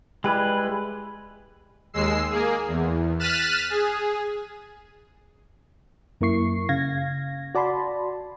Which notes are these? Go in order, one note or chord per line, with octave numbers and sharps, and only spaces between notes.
G3 G#3 E4 B4
D#2 G#3 E6 C7
A#3 G#4
E2
F6 F#6 A6 B6 D#7 E7
G#4
F#2 A#3 E4 C#6 C7
C#3 F5 G#6 A#6
F#4 D5 A5 B5 C6